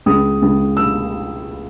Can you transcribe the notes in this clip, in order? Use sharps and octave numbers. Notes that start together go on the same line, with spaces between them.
C#2 D#6
C#2
E6